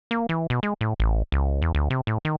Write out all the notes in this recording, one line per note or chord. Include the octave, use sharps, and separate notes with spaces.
A#3
E3
B2
G#3
A2
A1
C#2
E2
D2
C3
A2
D#3